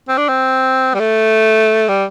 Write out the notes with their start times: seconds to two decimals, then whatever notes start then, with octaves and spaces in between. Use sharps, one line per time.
0.08 C4
0.18 D4
0.28 C4
0.94 G3
0.99 A3
1.88 G3